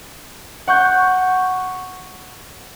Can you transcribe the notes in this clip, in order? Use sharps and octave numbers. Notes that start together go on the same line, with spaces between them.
F#5 C#6 G6